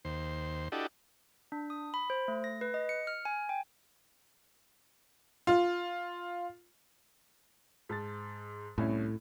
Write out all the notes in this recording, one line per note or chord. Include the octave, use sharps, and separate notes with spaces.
D#2 C5
D4 E4 F#4 G4 A4 D#5
D4
D#6
B5
C5
A3
A#6
B4
D#5
C#7
F6
G#5
G5
F4
G#2 A5 A6
C2 A2 C#4 E4